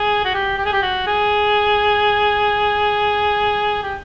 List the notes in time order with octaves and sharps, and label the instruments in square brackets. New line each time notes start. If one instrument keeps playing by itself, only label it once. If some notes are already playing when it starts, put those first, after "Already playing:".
Already playing: [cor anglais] G#4
F#4
G4
G4
G#4
G4
F#4
G#4
G4